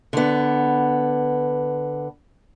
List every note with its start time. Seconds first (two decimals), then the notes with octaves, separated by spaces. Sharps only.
0.13 D3 B3